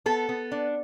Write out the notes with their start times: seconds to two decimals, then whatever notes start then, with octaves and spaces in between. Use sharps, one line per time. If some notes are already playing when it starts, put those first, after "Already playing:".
0.06 B3 A4
0.29 B3
0.52 D4